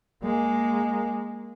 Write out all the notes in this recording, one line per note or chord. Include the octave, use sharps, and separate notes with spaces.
G#3 A#3